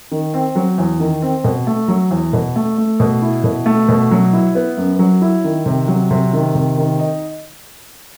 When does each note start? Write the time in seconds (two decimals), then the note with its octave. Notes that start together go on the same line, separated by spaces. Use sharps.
0.11 D#3
0.34 C4
0.55 F#3
0.78 E2
1.00 D#3
1.22 C4
1.44 B2
1.67 A3
1.88 F#3
2.11 E2
2.33 B2
2.56 A3
2.77 A3
3.00 B2
3.22 E4
3.44 B2
3.66 A3
3.89 B2
4.11 F#3
4.33 E4
4.55 B3
4.77 F#2
4.99 F#3
5.22 E4
5.44 D#3
5.66 C3
5.88 F#3
6.11 C3
6.33 D#3
6.55 C3
6.78 D#3
6.99 D#4